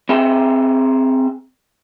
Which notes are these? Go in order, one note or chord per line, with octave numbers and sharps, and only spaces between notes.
C4 G#4 E5 G5